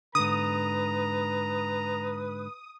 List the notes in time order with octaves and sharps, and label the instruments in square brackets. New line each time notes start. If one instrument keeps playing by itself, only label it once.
[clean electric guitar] G#2 D3 [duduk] B4 [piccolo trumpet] A#5 [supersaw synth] D#6